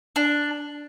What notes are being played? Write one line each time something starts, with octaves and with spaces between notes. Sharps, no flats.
D4